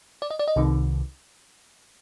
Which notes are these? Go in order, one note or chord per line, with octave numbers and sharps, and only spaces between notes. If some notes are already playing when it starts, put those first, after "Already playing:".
D5
D#5
D5
D#5
C2 C3 D#3